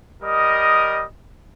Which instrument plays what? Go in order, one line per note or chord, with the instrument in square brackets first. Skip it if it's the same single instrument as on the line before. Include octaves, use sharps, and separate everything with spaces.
[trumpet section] G3 A#4 D#5 D#6